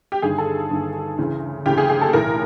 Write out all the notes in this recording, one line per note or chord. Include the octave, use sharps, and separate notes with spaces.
G4
G1 G2 D#3 G#4
A4
G1 G2 D#3
D2 C#3 E3
D2 C#3 E3 G4
G#4
G#4
A4
B1 A2 E3 A#4